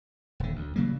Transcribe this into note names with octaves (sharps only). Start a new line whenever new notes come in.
D#1 D3
D2
C#3 F#3 G3 A#3